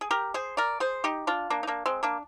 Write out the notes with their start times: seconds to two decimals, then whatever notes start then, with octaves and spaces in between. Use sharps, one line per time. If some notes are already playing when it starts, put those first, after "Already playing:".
0.01 G#4
0.11 G4 A#4
0.34 G#4 C5
0.57 A#4 D5
0.80 G#4 C5
1.04 D#4 G4
1.27 D4 F4
1.50 A#3 D4
1.63 D#4
1.67 A#3 D4
1.86 G#3 C4
2.03 A#3 D4